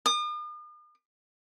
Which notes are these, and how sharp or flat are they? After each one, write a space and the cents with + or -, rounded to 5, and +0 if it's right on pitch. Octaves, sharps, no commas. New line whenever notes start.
D#6 -45